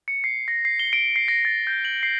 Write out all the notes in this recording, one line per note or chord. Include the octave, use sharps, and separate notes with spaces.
C#7
C7
A#6
C7
G7
D7
C7
A#6
A6
G6
F#7
C7